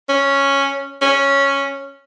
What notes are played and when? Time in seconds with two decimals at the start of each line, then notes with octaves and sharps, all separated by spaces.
0.09 C#4
1.02 C#4